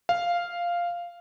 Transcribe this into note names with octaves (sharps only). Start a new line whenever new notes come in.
F5